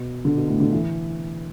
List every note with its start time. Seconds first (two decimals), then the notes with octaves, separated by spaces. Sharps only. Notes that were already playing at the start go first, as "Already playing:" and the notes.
Already playing: B2
0.25 D3
0.37 B2
0.48 A2
0.60 D3
0.73 E3